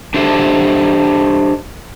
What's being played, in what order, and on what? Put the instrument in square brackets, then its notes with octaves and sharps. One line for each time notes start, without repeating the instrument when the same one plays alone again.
[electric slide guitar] D4 G4 A4 C5 E5